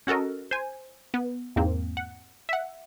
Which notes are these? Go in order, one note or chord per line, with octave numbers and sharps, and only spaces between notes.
C#4 F#4 A4 A#4 D#5
C5 G#5
B3
E2 G#2 A#3 C4
F#5
E5 F#5